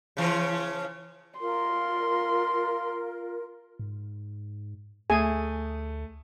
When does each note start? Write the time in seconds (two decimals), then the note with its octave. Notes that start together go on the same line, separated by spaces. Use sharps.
0.17 C#3 E3 F3
1.40 F4 A#4 C6
3.79 G#2
5.10 D2 A3 G#4 G#5